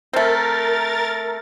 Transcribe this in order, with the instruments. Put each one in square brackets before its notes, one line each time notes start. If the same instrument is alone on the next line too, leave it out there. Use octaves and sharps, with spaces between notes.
[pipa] A3 C4 [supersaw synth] A#4 A6